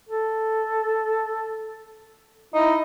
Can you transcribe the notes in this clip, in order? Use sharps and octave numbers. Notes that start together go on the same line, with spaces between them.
A4
D#4 E4